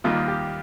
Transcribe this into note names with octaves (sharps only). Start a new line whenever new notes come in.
D#2 D#3 G3 A#3 F4
G4